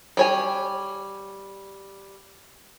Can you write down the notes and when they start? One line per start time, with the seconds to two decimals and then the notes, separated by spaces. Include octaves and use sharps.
0.17 G3 C#5 G#5